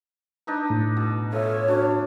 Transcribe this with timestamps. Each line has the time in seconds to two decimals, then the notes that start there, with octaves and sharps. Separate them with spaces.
0.47 D4 D#4 B4
0.70 A2
0.97 B2
1.33 F4 A4 C#5 E5
1.68 C#4 D4 F#4